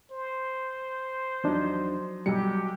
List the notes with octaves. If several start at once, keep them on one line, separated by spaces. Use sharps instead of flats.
C5
E2 F3 F#3 D4 D#4
B1 F#3 G3 G4 C#7